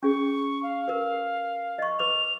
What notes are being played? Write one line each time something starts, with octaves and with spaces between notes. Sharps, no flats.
C#4 G#4 C#6
F5
A#4 B4
D#5 C#6
B4 D6 F7